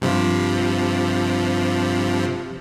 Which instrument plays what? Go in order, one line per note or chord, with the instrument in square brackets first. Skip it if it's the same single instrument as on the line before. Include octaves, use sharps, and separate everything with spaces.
[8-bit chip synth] G2 C3 F3